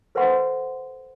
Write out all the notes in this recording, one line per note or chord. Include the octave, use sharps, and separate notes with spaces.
A4 B4 C5 E5 F#5 C6